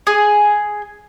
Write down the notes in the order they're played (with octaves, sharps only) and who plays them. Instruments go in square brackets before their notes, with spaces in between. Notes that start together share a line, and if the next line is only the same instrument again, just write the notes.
[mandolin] G#4 D#6